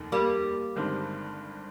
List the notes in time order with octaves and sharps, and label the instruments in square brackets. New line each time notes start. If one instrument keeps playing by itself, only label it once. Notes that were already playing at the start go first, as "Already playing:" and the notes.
Already playing: [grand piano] F1 D#2 D#3
[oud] G3 A#3
[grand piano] G1 G2 D#3 G#3 C4